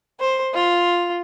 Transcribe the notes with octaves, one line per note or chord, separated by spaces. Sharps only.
C5
F4